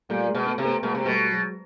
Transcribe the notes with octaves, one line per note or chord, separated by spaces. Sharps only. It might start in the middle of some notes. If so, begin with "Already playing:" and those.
A#2 G3 A3
G#3 A#3
B2
A3 B3
C3
A3 B3
B2 G#3 A#3
C3
B2 G3 A3
F#3 G#3